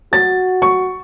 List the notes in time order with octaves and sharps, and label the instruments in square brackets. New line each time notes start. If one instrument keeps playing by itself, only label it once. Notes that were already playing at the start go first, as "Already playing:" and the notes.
[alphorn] F#4 [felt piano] A6
[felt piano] C#6